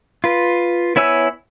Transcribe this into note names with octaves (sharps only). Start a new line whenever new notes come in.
F4 B4
B3 E4 C#5 G#5 E6